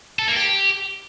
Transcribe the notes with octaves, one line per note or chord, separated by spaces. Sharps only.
A4
A#3
G4